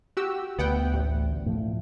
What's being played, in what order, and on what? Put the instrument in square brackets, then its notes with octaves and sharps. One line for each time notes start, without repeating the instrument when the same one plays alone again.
[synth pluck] F#4 G4 E6
[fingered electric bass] D2 [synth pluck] B3 F#5 G5
[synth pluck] A1
[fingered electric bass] A2 F3